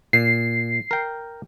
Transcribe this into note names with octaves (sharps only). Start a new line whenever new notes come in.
A#2 C7
A#4 G5